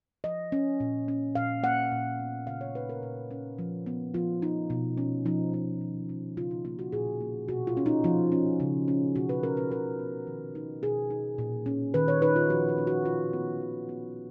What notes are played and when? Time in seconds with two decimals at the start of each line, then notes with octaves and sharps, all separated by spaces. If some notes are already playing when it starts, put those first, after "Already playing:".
0.24 F3 D#5
0.52 C#4
0.80 A#2
1.08 C#4
1.35 A#2 F5
1.63 A#3 F#5
1.92 A#2
2.19 B3
2.47 C#3 F5
2.61 C#5
2.75 D#4 B4
2.89 A#4
3.03 A#2
3.31 C#4
3.59 F3
3.86 B3
4.14 F3 F4
4.42 D#4
4.70 B2
4.98 C#4
5.26 F3 D#4
5.54 D#4
5.81 D#3
6.09 C#4
6.37 C#3 F4
6.51 D#4
6.65 A#3 F4
6.79 F#4
6.93 A#2 G#4
7.21 A#3
7.48 B2 F#4
7.67 F4
7.77 C#4
7.86 D#4
8.04 F3 F4
8.32 C#4
8.60 C#3
8.88 C#4
9.16 B2 F#4
9.29 B4
9.43 C#4 A#4
9.57 B4
9.71 C#3 A#4
9.99 B3
10.27 D#3
10.55 D#4
10.83 B2 G#4
11.11 D#4
11.38 A#2
11.66 C#4
11.94 D#3 B4
12.08 C#5
12.22 D#4 B4
12.36 F4
12.50 F3 F#4
12.69 F4
12.78 C#4
12.87 F#4
13.05 B2 F4
13.33 B3
13.61 D#3
13.89 B3